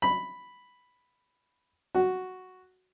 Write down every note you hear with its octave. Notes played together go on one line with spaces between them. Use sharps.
B5
F#4